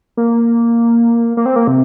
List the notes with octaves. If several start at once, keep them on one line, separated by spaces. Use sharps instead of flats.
A#3
A#3
C4
A#3
C3